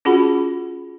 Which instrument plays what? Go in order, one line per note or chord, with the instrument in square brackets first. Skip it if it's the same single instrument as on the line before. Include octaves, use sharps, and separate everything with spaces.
[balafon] C#4 F4 F#4 G#4 F#5 B5